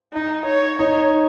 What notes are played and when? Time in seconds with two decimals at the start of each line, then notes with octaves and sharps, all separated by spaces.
0.13 D#4
0.46 C#5
0.79 D#4 C#5